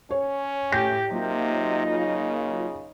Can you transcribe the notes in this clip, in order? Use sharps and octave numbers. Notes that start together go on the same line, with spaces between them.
C#4 C#5
A2 G4 G6 A#6
C3 F#3 A#3 D#4 F4
C#3